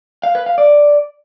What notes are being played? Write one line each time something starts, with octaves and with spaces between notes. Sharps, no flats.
F5
B4
F5
D5